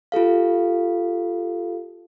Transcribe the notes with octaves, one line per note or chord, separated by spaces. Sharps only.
F4 G4 A4 F5